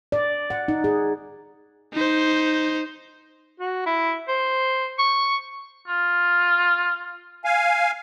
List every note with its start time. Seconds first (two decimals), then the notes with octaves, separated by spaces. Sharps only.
0.12 D5
0.50 F#5
0.68 D#4
0.84 G#4
1.93 D#4 C5
3.60 F#4
3.86 E4
4.28 C5
4.99 C#6
5.88 F4
7.45 F5 G#5